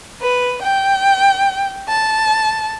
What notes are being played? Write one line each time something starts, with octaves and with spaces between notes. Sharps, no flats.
B4
G5
A5